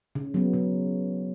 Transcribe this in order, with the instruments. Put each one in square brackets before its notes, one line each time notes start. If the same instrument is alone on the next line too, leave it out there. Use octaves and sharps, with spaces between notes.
[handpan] C#3
F#3 B3
C#3